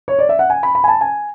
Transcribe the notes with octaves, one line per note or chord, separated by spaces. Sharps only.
C#5
D5
E5
F#5
G#5
B5
B5
G#5
A5
G#5